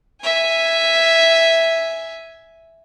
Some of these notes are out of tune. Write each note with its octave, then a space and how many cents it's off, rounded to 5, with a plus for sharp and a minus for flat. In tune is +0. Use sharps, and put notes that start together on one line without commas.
E5 +0 G#5 +0